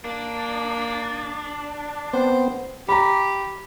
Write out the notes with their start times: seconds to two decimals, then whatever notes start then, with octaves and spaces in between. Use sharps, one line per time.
0.05 A#3 D4
2.13 B3 C4 C5
2.89 G4 A#5 B5